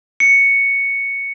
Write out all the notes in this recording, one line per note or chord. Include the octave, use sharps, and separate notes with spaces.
C#7